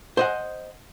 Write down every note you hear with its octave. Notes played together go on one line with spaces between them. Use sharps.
C5 D#5 F#5